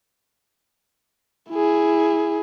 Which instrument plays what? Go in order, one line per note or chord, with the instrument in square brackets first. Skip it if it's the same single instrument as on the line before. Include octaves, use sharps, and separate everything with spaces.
[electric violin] E4 G#4